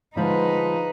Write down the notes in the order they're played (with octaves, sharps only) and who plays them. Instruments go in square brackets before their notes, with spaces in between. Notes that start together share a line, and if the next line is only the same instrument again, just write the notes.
[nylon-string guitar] D3 F3 G#3 [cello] D#4 B4